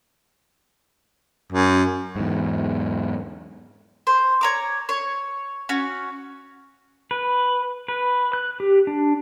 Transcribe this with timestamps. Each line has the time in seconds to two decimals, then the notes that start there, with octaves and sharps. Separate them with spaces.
1.52 F#2
2.16 E2 G#2
4.07 C5
4.41 C#5 A#5 D6
4.89 C#5
5.69 C#4 F#4
7.11 B4
7.88 B4
8.33 F#6
8.60 G4
8.87 D4